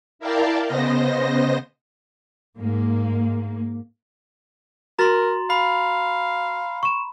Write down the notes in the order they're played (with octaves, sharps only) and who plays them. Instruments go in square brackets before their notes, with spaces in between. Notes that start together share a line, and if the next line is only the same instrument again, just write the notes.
[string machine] E4 A#4 D5 F5 G5 A5
C#3 B3 C5 D#5 A#6
[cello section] G#2 A#3
[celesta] F#4 A6 [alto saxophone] A#4 [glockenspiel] A#5 C6
[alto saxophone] F5 [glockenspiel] B5
[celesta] C#6 E7